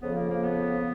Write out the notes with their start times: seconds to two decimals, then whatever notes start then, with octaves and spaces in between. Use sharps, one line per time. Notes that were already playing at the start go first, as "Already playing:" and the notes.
0.01 F2 C#3 F3 B3
0.15 A#3
0.30 A#3
0.43 B3